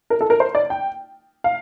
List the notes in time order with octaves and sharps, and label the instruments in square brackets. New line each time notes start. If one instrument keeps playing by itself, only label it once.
[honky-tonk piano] A#4
A4
A#4
C5
D5
G5
F5